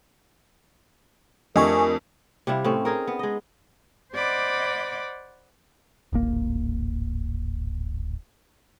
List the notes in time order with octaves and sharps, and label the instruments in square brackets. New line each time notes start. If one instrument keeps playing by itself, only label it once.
[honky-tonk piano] F2 [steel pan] A3 D4 G4 [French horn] A#4 [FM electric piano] D#5 G#5 C#6
[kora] C3 G3 E4 F5
A2 C4 C#4
D#4 G#4 A#4
B3
G#3 D#5
[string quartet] C5 D5 D#5 F#5 B5 D6
[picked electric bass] D1 G#1 A#3